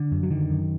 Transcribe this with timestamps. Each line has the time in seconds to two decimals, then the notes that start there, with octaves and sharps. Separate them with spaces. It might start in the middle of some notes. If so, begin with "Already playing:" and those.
Already playing: D3
0.12 F#2
0.23 F#3
0.30 D3 D#3
0.50 F#2